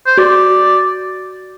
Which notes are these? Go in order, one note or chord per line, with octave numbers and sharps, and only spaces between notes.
C5
F#4 D5